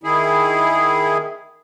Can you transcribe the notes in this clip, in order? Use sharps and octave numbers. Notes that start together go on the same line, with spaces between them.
D#3 E4 G#4